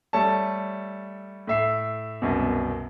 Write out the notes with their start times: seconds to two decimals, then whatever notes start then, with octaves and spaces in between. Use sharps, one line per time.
0.13 G3 A3 C#5 A5
1.47 A2 E5 C7
2.22 C2 F#2 B2